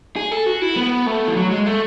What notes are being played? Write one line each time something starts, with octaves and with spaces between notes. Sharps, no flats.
G#4
A4
F#4
E4
B3
A3
E3
F#3
G#3
A3